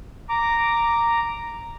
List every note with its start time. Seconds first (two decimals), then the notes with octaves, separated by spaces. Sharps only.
0.29 A#5 D6